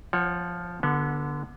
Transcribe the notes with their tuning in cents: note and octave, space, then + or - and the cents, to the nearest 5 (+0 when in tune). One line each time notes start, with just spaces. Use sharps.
F3 +0 C#5 -30 F#5 +0
D3 +0 B3 -30 F#4 +0